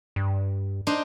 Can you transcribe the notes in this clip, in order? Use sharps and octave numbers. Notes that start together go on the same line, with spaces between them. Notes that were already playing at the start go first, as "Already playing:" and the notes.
G2
D4 D#4 C5